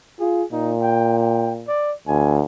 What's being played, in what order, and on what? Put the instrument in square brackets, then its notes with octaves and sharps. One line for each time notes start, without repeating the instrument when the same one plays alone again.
[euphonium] F4 [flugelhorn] G#4
[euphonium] A#2 [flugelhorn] D#4
[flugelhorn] G5
G5
D5
[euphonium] D2 [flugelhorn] G#5